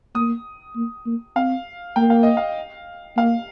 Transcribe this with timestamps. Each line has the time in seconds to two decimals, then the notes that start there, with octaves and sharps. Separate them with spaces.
0.15 A#3 D#6
0.76 A#3
1.06 A#3
1.36 C4 F5
1.96 A#3 G5
2.10 F5
2.23 D#5
2.37 F5
3.17 A#3 F5